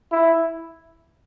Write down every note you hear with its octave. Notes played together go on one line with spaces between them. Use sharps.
E4